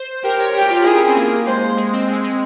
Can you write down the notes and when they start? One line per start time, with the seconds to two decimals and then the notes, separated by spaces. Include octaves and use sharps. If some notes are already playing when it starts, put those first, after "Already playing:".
Already playing: C5
0.24 G4 A#4
0.39 C#5
0.54 G4 A#4
0.70 F4
0.85 E4 G#4
0.95 C#4
1.06 C4
1.16 A#3
1.47 G#3 C5
1.77 G#3
1.93 C4
2.08 G#3
2.23 G#3